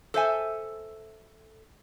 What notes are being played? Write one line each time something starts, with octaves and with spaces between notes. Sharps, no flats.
A4 C5 E5 G#5